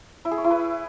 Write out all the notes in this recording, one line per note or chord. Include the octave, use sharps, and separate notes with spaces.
E4
G#4
C#5
E4
B4